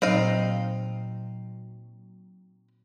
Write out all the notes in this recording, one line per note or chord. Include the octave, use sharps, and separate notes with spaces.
A#2 F#3 C4 D#4 F5